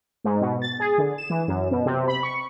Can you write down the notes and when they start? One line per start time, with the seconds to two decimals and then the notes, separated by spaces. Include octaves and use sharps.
0.24 G#2
0.41 B2
0.62 A6
0.80 G#4
0.98 D3
1.18 E7
1.30 E3
1.48 F#2
1.71 B2
1.86 C3
2.08 B5
2.23 C#6